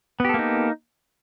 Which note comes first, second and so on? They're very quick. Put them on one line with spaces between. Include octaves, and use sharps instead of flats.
B3 G4 A4 A#3 D#4